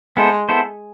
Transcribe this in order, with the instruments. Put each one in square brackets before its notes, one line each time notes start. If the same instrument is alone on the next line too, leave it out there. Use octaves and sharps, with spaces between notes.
[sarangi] G#3 [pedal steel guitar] B3 E4 A4 C5
[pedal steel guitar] B3 E4 A4 C5